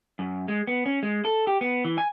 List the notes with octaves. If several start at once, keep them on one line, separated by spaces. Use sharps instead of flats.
F#2
G#3
B3
C#4
G#3
A4
G4
B3
E3
G#5